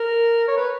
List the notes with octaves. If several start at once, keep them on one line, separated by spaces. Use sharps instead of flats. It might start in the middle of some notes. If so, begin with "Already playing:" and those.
Already playing: A#4
C#5
B4